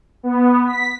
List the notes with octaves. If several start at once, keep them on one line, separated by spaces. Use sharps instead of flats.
B3
B6